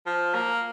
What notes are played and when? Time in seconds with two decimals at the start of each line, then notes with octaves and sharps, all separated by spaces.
0.06 F3
0.34 A#3